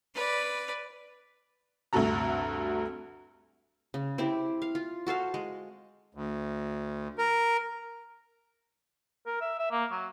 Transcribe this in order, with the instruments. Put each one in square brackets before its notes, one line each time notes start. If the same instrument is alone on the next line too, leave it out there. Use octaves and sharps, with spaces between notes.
[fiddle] B4 D5
[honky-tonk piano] D2 G2 C3 F#4 A4 A#5
[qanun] C#3
C4 E4 G4
F5
F4
F#4 A4 C5 F5
G#3
[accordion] D2
A#4
[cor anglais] A#4
E5
E5
A#3
F#3